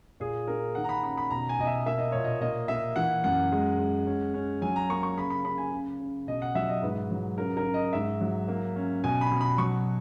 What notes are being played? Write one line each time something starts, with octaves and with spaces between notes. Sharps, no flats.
A#2 G#4
A#3 A#4
D#3 F#5
A#5
B5
C#4 B5
B5
B2 A#5
G#5
B2 D#5
E5
A#3 E5
D#5
A#2 C#5
D#5
A#3 D#5
A#3 E5
E3 F#5
F#2 F#5
G#3
G#3
C#4
C#4
F#3 G#5
A#5
A#3 C#6
C#6
C#3 B5
B5
C#3 B5
G#5
C#3
C#3
B2 D#5
F#5
F#3 E5
D#5
G#2 B4
F#3
C#3 A#4
A#4
C#3
D#5
G#2 E5
F#3
A#3
C#4
B2 G#5
B5
B2
B5
F#3 C#6